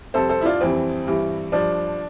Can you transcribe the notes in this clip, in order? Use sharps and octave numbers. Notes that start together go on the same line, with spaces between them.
F2 C3 G3 A4 C5
A4 C5
E4
D4 F4
F2 E3 G3 C4
G2 E3 G3
G2 F3 D4